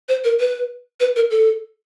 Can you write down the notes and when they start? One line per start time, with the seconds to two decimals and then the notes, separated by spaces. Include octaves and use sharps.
0.09 C5
0.24 A#4
0.40 B4
1.00 B4
1.16 A#4
1.31 A4